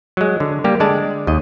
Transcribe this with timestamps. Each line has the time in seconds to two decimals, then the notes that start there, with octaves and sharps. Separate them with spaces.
0.17 F#3 G#3
0.40 D3
0.64 G3 A#3 G4
0.80 D3 G#3 D5 A5
1.27 D#2 D#5